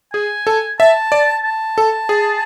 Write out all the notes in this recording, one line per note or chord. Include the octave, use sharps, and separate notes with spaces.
G#4 G#5
A4
E5 A5
D5
A5
A4
G#4